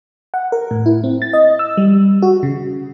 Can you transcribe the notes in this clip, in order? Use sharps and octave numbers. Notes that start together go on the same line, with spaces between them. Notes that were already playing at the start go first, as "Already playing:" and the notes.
F#5
A#4
A2
E4
C4
A6
D#5
E6
G3
F#4
C#3